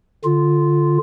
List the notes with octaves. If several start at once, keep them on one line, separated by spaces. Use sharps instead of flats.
D3 F4